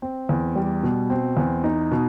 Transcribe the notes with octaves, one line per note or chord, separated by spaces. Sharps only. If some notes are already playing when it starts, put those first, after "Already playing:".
C4
E2
G3
B2
C4
E2
D#4
B2